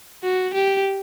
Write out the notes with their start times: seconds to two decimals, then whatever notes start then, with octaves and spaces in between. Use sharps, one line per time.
0.23 F#4
0.54 G4